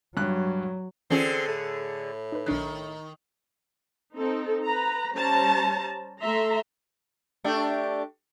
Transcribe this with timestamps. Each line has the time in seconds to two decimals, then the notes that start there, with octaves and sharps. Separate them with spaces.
0.17 G2 F#3 F#6
1.10 D3 E3 C4 C#4 F4 G#4
1.48 A2 A4
2.32 D#4 B4
2.46 B1 D#3 D4 F#6
4.15 C4 D#4 A4
4.64 B4 A#5
5.14 G3 C#4 C5 A5 A#5
6.20 A3 A4 E5 A#5 C6
7.44 A3 D4 G4